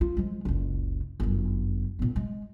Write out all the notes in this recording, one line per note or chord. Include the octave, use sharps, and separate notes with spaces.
F4
F3 G#3
F#1 C#2
G1 F#2
A#2 B3
G#3